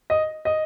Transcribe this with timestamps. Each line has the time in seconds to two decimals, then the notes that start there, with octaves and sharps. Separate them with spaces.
0.10 D#5
0.45 D#5